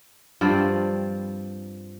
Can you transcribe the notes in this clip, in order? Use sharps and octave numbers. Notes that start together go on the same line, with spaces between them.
G2 F3 C4 D5